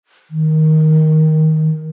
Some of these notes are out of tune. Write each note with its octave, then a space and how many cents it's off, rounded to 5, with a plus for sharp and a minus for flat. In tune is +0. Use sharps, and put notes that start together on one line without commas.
D#3 +10